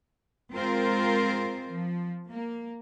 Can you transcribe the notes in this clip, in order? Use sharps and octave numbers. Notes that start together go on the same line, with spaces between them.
G#3 C4 F4 A#4 C5
F3
A#3